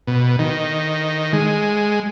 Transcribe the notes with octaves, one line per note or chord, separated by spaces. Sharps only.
B2
D#3
G#3